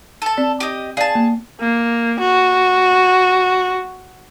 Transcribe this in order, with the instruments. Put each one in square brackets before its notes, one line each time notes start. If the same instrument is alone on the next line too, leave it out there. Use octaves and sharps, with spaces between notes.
[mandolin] A4 A5
[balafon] C4 D5
[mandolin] G4 D#5
[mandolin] G#4 A5 [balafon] D5 F5
[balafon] A#3
[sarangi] A#3
F#4